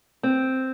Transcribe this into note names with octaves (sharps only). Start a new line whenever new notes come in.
C4